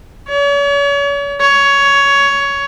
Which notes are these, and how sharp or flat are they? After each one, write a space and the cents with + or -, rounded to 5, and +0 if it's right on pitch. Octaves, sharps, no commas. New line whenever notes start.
C#5 +40
C#5 +15